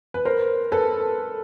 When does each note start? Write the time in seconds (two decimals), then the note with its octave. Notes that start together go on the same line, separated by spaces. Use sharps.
0.14 B4
0.25 A#4 C5
0.72 A4 B4